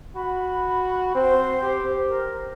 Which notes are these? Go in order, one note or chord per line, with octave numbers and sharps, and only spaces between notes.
F#4 B5
C4 C5
G4
A#4